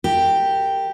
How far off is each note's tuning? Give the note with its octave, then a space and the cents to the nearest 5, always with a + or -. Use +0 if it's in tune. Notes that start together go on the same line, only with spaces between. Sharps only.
G4 +0 A#4 -30